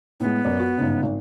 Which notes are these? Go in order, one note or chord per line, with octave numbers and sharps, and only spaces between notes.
A2 G#3 B3
F#2 D5
F#4
G1 G#2 C#3
G#1